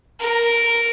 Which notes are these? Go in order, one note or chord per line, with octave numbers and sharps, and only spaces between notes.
A#4